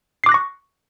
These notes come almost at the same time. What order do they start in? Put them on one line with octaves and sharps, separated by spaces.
C7 D6 F#6 A#6 C#6